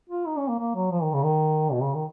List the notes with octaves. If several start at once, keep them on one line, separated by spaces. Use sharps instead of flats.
F4
D#4
C#4
A#3
A#3
F#3
F3
D#3
C#3
D#3
B2
C#3
D#3